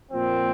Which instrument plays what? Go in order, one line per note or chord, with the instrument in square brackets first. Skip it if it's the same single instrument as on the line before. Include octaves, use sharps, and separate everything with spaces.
[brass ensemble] A#2 F3 A#3 C4